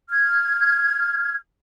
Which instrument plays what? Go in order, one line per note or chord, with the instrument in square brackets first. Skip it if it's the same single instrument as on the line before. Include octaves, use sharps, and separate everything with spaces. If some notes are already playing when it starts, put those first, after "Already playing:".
[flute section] F6 G#6